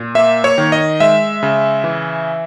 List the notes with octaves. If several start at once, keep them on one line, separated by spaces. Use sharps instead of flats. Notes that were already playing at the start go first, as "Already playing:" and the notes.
Already playing: A#2
A#3 E5
C#5
D#3
D#5
G#3 E5
C#3
E3